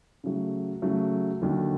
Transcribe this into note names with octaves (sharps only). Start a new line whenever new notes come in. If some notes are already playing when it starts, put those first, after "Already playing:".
C#3 F#3 A3
C#3 F#3 A3
D#2 D3 F#3